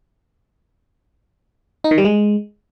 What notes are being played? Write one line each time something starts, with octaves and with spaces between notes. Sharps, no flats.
D#4
D#3
G3
G#3